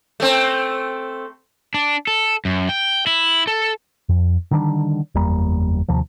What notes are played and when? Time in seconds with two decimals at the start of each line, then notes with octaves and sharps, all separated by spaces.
0.20 A3 C4
1.74 D4
2.07 A4
2.45 F#2
2.69 G5
3.07 E4
3.47 A4
4.09 F2
4.51 D3 D#3 G3 D4
5.15 F#1 E2 G3 A#3
5.88 D#2 C3 F3